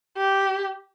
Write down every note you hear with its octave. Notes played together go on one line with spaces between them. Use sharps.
G4